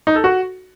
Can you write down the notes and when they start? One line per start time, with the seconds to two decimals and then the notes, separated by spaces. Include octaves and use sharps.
0.07 D#4
0.15 A4
0.24 F#4